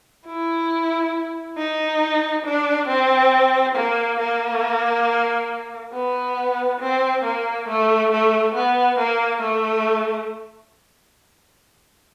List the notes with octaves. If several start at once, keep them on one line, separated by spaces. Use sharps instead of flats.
E4
D#4
D4
C4
A#3
A#3
B3
C4
A#3
A3
A3
B3
A#3
A3